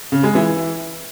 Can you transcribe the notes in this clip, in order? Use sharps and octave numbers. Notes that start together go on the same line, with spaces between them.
C#3
G#3
E3